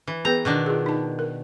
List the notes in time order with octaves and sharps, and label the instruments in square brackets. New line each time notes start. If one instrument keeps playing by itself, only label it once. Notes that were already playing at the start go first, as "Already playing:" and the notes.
[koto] E3
[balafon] B3 G#4 B4 [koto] A#5
[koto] B2 D#3 D4
[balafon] F4 G#4
D#4 A5
A#4